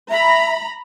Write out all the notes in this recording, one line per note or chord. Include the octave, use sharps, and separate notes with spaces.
E5 A#5 B5